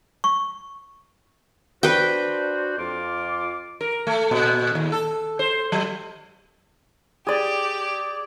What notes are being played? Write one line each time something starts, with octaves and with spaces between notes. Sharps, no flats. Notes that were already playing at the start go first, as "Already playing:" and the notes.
C#6
D4 F#4 B4 C5 G5
F2 F4 D6
A#4
A3
A#2
D#2
A4
C5
F#3
G4 G#4 D5 D6